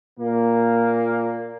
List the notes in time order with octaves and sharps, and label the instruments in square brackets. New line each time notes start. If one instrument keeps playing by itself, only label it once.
[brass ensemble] A#2 A#3